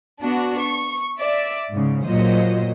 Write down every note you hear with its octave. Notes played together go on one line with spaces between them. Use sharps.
B3 D4 F#4
C#6
D5 E5
G#2 C#3
A#2 F#3 F4 C5 D#5